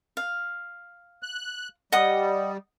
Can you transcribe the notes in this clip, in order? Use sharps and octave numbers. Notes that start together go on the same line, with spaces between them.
F5
F#6
G3 D#5 F#5 D#6